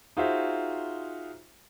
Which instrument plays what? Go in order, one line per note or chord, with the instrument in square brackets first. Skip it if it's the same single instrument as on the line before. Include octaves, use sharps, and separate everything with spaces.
[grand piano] D#4 F4 F#4 G#4 C5 E5